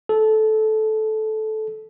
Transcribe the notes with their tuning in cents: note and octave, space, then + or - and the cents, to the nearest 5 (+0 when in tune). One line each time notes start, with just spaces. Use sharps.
A4 -15